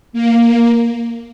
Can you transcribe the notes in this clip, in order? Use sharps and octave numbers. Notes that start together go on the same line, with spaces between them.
A#3